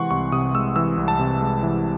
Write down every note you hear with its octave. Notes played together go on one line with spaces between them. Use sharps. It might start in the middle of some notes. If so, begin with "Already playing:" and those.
Already playing: C3 E3 G#3 F#5 C6 C#6
C2 C#6
C3 D#6
G#3 E6
E3 E6
C2
A5
C3
G#3
E3